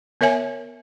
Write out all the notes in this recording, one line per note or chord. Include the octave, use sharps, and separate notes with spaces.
B3 A#4 C#5 E5 G#5